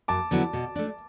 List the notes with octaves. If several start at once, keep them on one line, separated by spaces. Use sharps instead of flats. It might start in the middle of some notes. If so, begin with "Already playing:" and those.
F#2 A5 D6
D3 F#3 B3 E4
B2
A3 D4